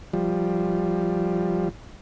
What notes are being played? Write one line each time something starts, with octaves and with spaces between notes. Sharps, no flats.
F3 G3